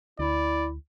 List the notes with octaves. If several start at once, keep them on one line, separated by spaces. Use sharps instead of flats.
D2 E4 D5